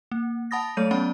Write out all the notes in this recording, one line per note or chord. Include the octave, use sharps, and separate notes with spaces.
A#3
F#5 A5 B5 D#6 A6 A#6
F#3 A3 A4 C#5 G6 D#7
F#3 B3 C#4 F#5 B5